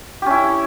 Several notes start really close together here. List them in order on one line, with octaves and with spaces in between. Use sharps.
G4 C#4 E4